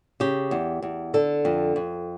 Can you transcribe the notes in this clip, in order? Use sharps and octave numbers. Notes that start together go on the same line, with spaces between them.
C#3 G4
E2
E2
D3 A4
F2
F2